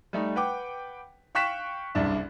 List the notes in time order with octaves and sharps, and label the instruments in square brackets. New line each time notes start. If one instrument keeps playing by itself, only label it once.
[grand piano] G3 A3 D#4
B4 F#5 G5 D6
F5 G5 C#6 F#6 B6 E7
F#1 C2 G2 D4 E5